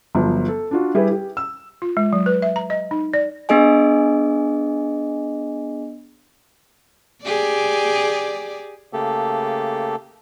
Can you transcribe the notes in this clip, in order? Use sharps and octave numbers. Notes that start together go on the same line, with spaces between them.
G1 F3 F#3
A4
D4 F4 F#4
G3 E4 G4 G#4 B4
G4
E6
F4
G#3
F#3
B4
E5
A#5
D#5
D#4
D5
B3 D4 G#4 D#5 G#5
G4 G#4 D5
C#3 A3 A#3 G4 A4